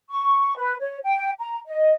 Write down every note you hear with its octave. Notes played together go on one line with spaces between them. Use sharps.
C#6
B4
C#5
G5
A#5
D#5